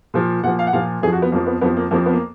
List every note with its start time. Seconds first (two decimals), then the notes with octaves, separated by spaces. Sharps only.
0.14 A#2 F3
0.43 A#2 F#5
0.47 F3
0.59 F5
0.67 F#5
0.73 A#2 F3 F5
1.02 F2 G#4
1.07 F3
1.13 F#4
1.22 B3
1.32 F2 F3 A#3
1.47 B3
1.61 F2 F3 B3
1.77 A#3
1.91 F2 F3 A#3
2.06 B3
2.13 A#3